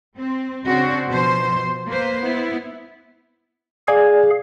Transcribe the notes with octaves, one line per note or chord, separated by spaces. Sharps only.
C4
C#3 C4 D4 F#4 C5
B2 F3 C5
A#3 B4 C5
B3 E4
G#4 D5 F5 G#5 G#6